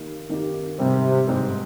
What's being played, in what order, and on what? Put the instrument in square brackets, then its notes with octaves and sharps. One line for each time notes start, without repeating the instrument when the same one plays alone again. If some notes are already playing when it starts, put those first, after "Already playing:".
Already playing: [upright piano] D#3 A#3 D#4 G4
D#3 A#3 D#4 G4
[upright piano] G#2 G3 C4 [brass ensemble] C3
[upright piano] G#2 G3 C4